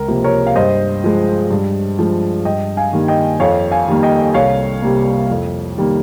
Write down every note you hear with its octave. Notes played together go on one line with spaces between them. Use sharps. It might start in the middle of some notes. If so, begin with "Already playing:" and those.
Already playing: C#2 A#4
C3 F3 A#3
A#4 C#5
F5
G2 C5 D#5
F3 G#3
G2
F3 G#3
G2 D#5 G5
F5 G#5
D#3 G3 A#3
D#5 G5
F2 C#5 F5
F5 G#5
D#3 G3 A#3
D#5 G5
C2 C#5 F5
C3 G3 A#3
F2
D#3 G3 A#3